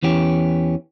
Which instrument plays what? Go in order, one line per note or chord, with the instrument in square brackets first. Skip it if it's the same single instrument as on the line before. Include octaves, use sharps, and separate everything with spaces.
[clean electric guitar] E2 E3 C#4 G4